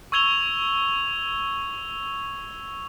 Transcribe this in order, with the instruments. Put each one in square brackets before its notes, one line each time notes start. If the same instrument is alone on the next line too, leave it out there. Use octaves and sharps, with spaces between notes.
[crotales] C#6 E6 G#6 F7 G7